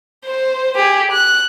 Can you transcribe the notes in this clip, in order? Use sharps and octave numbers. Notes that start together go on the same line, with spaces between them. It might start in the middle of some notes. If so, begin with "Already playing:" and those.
C5
G4 G#4
F#6